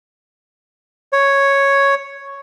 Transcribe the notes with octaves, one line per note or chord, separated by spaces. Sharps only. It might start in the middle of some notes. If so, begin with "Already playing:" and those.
C#5